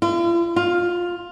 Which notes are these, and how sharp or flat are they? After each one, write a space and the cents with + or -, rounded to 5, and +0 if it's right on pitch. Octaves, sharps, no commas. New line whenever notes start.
F4 -45
F4 +10